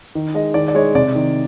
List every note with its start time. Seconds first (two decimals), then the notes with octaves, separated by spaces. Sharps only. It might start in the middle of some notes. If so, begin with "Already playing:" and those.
0.15 D#3
0.34 G#3 D#5
0.54 D#3 D5
0.68 D5
0.75 G#3 C#5
0.95 C3 D5
1.15 D#3